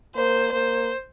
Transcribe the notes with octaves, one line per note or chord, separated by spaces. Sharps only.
A#3 C5
A#3 C5